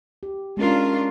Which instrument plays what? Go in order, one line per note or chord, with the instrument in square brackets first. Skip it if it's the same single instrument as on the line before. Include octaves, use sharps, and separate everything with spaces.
[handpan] G4
[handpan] G#3 C#4 A#4 [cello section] D4 F4